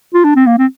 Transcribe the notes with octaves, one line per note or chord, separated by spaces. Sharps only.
F4
D4
C4
A#3
C4